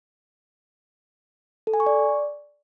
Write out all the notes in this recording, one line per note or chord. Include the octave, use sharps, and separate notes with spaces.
A4
G#5
C#6
D5